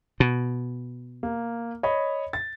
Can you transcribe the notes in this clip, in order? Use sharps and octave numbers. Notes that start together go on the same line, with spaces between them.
B2
A#3
C#5 D#5 B5
A6